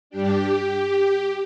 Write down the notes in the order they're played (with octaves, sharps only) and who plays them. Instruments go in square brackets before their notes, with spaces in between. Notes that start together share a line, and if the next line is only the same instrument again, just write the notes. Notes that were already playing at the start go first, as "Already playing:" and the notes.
[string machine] G2 G3 D4 G4